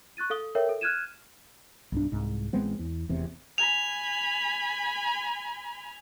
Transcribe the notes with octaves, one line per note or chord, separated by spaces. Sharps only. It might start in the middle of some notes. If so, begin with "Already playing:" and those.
C#6 F#6 A6 D#7
A4 F5 D#6 G7
A4 A#4 C#5 E5 F5 G5
A4
F6 F#6 G#6 D#7 E7
B1 G2 D4
C2 G#2
A1 G#3 B3 C4
E2
F1 E2 C3
G#5 B5 F7